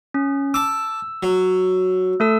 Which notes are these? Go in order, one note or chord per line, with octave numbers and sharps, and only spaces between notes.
C#4
A5 D6 E6
F#3
A3 A4 E6